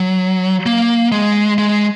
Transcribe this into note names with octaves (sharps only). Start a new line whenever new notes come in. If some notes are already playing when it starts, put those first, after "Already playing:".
Already playing: F#3
A#3
G#3
G#3